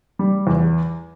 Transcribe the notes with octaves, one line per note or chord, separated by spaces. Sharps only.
G3
E2